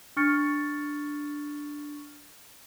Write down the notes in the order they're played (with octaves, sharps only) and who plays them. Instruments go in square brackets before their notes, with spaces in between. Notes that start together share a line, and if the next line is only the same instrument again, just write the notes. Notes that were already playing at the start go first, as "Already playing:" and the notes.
[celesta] D4 C#6 F6 A6 C#7